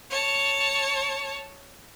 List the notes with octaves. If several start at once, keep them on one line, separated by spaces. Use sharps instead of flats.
C#5 A5